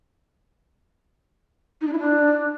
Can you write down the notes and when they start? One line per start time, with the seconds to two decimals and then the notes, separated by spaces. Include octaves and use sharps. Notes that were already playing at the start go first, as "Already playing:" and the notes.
1.81 D#4
1.87 D4
1.93 E4
1.99 D4